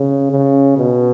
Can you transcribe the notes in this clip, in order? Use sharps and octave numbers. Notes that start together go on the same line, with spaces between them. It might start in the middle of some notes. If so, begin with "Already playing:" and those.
Already playing: C#3
C#3
B2